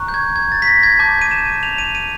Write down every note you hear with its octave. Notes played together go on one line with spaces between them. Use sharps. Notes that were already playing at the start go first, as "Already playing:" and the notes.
Already playing: A#5 C#6 F#6
G6
G#6
G#6
A6
B6
A#6
G#6
A5 D6 G6
D#7
E7
F7
D#7
D#7